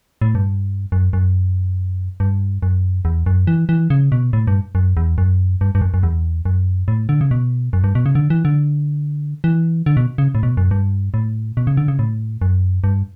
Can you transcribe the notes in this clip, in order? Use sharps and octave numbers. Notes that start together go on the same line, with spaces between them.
A2
G2
F#2
F#2
G2
F#2
E2
F#2
E3
E3
C#3
B2
A2
G2
F#2
E2
F#2
G2
G2
F#2
F#2
E2
F#2
A2
D3
C#3
B2
F#2
G2
B2
C#3
D3
E3
D3
E3
D3
B2
C#3
A2
B2
F#2
G2
A2
B2
C#3
D3
C#3
A2
F#2
G2